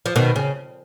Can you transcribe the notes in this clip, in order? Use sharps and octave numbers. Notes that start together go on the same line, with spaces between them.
F3
B2 D#3
C#3